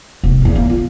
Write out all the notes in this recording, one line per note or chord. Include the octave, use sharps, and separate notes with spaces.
D#1 C3
A#1 E2
A#3
F4